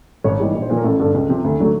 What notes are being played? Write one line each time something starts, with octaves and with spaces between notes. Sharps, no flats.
G#1 C#5
G#2 E3 G3
A#1
C5
A#2 F3 B4
A#4
A1 A4
G2 D3 A4
C#2
C3 F3
D2
D3 F#3 A3